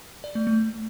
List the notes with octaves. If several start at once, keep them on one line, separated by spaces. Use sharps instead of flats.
D5
A3
A3